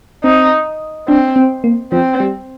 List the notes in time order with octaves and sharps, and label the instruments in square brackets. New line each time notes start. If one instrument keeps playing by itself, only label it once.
[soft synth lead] C4 [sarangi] D#4
[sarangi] C4 [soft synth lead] D4
[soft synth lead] C4
A#3
[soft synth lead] F3 [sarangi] C4
[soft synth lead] G3